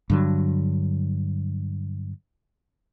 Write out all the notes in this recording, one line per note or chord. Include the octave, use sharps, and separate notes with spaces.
G2 D3 F#3